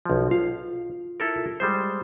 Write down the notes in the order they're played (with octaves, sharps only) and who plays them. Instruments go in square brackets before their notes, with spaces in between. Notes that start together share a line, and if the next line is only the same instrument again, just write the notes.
[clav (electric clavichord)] B1 F3
[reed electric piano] F4 [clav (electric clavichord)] F5
[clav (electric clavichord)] E4 A4 A#4
G3 G#3 C5